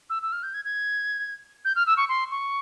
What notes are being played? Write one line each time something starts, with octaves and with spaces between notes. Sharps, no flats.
E6
E6
F6
G6
G#6
G#6
G6
F6
E6
C#6
C6
C#6